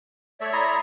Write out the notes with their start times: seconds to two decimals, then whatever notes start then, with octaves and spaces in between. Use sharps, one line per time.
0.41 A3 C#5 D5 E5
0.53 E4 A#5 C6 D#6